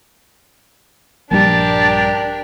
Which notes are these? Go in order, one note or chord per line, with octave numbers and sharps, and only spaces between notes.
A#1 G2 G3 D4 G4 A#4 A5